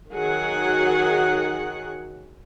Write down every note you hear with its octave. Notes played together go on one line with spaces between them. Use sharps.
D#3 F#3 F#4 G#4 F#5